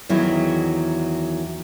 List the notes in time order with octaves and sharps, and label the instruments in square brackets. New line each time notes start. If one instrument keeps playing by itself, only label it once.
[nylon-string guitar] E2 D#3 F#3 E4